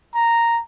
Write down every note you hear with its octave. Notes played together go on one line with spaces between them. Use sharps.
A#5